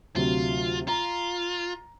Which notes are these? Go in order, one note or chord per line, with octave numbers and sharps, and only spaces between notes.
D2 C3 F#3 F4
F4 A#5